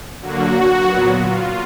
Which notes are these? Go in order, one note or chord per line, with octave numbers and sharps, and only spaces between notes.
D3 F#3 A#3 F#4
A#2 F#3 B3
F4